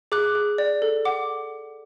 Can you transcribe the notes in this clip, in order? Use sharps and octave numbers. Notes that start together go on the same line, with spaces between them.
G#4 D6 F#6
G#4
D5
A4
F#5 D6